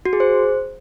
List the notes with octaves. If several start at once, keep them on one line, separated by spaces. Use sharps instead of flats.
F#4
G#4
C5